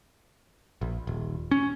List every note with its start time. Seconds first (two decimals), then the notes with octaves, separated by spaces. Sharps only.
0.81 A#1
1.07 D#1
1.51 C#4